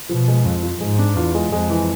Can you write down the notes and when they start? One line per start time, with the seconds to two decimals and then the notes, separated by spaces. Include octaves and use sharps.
0.09 B2 F3
0.28 G#3
0.45 F2 F4
0.63 F3
0.81 G#2 G#3
0.99 D4
1.16 E2 F4
1.35 G#3
1.52 F2 G#3
1.70 E3